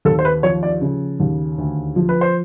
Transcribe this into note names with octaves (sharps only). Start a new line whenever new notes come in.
D#2 A4
C5
B4
F3 C#5
D5
C#3
D#2
D2
F3
B4
C5